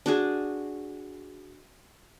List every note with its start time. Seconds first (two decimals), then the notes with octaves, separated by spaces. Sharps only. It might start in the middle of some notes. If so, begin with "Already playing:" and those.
0.06 D4 F#4 G#4